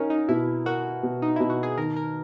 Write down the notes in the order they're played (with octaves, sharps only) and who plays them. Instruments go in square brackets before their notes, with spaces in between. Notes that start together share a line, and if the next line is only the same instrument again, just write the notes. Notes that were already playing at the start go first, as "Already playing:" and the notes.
Already playing: [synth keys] C#4 D#4 F#4 [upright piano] A#4
[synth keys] D#4
[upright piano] B2 [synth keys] E4
[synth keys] F#4 [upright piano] A#4
[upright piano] B2
[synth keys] D#4
[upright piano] B2 [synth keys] E4
[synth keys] F#4
G#4
[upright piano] D#3 [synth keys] A#4
[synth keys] A#4